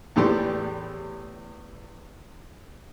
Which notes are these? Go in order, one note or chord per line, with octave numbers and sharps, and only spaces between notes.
E2 A2 E3 G4 D5 C6